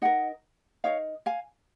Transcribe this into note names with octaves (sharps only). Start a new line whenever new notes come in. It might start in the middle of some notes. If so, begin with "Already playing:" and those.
D#4 A#4 D#5 F#5
D#4 A#4 C#5 F5
F5 G#5